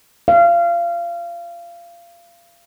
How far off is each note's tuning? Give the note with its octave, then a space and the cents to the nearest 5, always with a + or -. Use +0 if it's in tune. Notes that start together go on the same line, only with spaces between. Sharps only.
F5 -25